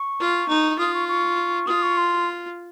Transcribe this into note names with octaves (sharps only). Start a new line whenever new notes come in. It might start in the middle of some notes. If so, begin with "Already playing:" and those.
Already playing: C#6
F4
D#4
F4 D#6
C#6
C#6
F4 D#6
C#6
C6